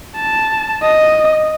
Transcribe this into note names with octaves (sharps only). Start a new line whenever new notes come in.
A5
D#5